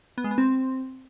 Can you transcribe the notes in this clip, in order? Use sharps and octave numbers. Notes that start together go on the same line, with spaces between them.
B3
G#3
B3
C4